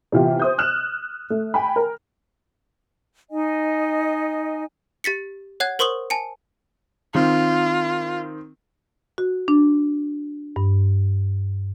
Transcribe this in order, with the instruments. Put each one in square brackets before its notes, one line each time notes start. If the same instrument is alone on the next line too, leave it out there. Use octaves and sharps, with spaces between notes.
[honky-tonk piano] C3 E3 B3 F4 G4
C5 D#6 G6
F6 F#6 E7
A3
G5 G#5 B5
A#4
[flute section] D#4 D#5 G#5
[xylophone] G4 A6 B6 C#7
C#5 F#5 F#6 G#6
A#4 C5 C6 C#6 D#6 F#7
G#5 A5 C#7
[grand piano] D#3 C4 [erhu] F4
[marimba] F#4
D4
G2